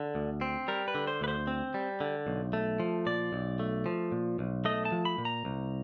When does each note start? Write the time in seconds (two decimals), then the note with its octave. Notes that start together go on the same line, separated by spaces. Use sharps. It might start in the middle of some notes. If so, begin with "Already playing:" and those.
Already playing: D3
0.15 D2
0.41 C4
0.68 G3 A#4
0.88 B4
0.95 D3
1.07 C5
1.21 D2 B4
1.28 C5
1.47 C4
1.74 G3
2.01 D3
2.27 B1
2.53 A3
2.80 F3
3.06 A#2 D5
3.33 B1
3.59 A3
3.86 F3
4.12 A#2
4.39 B1
4.65 A3 D#5
4.85 A5
4.92 F3
5.05 B5
5.18 A#2
5.25 A#5
5.45 C2